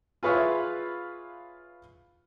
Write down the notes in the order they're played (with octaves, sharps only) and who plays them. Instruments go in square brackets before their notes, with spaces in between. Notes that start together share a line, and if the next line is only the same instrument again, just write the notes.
[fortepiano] F4 G#4 B4 C#5 E5 F5